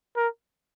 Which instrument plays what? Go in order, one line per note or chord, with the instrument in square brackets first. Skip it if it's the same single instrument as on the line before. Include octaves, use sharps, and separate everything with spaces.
[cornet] A#4